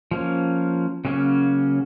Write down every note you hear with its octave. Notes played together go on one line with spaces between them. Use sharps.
F3 A#3 C#4
C#3 F#3 A#3 C#4